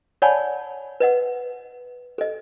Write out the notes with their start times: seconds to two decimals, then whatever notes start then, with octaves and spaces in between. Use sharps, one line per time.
0.22 C#5 D5 F#5 G#5 A5 B5
1.00 B4 D#5 F#5
2.18 A4 D#5